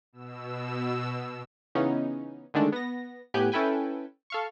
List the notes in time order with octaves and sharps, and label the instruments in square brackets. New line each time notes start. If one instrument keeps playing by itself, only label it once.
[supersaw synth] B2 E6
[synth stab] C#3 E3 B3 C#4 D#4
D3 D#3 G#3 A3 D4
B3 A#6
A2 B3 G4 G#5 F#6 G6
C#4 E4 A4 B4 G5 G#5
A4 F5 C#6